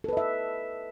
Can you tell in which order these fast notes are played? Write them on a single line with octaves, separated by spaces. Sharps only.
A4 B4 D#5 E5